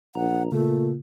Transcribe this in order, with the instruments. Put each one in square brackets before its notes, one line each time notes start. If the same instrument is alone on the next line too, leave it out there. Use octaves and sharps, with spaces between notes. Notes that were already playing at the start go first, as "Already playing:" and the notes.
[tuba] A#1 [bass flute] F#5 [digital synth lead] A#5
[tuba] A#2 [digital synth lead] C#3 [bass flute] A3